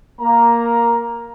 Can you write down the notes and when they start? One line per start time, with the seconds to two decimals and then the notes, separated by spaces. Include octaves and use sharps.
0.20 A#3 A#5